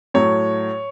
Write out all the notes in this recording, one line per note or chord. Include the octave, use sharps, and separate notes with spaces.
A2 F#3 C#5